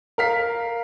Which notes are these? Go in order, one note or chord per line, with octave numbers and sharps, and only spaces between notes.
A#4 F5 B6